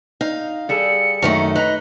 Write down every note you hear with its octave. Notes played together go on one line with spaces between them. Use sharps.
D#4 F5
G3 G#4 A4 C#7
F#2 D#3 A3
D#4 B4 A#5